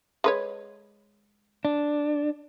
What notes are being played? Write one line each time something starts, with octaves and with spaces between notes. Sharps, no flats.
G#3 B4 C#5
D4